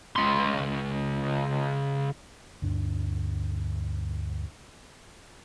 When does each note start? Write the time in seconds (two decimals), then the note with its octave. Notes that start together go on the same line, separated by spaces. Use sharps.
0.16 C#2 C6
2.62 D2 G2 D4